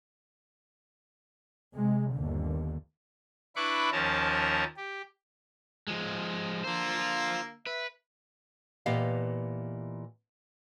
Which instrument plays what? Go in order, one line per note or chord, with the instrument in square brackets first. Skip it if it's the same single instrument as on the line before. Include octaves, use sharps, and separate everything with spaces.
[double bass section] C3 G#3
G1 D#2 D3
[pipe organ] D4 E4 B4 B5 C#6 D6
D#2 F3 C#4 A#4 A5
G4
[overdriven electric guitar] F3 G#3
[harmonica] D3 A#3 E6 [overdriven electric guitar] F4 C5
[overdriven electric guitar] B4 [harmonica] E5
[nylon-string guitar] A#2 E3 B3 G4 D#5 F5